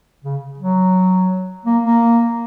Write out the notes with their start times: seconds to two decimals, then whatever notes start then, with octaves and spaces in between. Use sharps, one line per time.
0.24 C#3
0.59 F#3
1.65 A#3
1.83 A#3